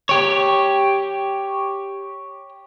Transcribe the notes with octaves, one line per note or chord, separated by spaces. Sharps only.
G4 C#5